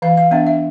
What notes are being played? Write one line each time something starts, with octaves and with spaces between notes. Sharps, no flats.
E3 F5
F5
B3 D4 E5
E5